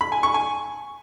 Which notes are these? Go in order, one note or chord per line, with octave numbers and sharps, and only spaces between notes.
B5
G#5
C#6
G#5